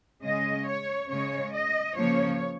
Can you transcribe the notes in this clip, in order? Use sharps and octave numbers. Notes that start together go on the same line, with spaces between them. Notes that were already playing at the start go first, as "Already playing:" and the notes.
C#3 G#3 D#5
C#5
C#3 G#3 C#5
D#5
C#3 F3 A#3 C#5